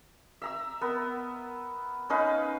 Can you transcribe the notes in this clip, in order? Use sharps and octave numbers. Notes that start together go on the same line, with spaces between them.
E5 A#5 E6
B3 A#4
C#4 D#4 B4 F5